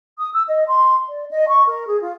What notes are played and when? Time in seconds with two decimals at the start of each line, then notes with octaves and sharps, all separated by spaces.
0.19 D#6
0.34 E6
0.48 D#5
0.68 C6
1.10 D5
1.32 D#5
1.48 C#6
1.66 A#4
1.87 G#4
2.01 F4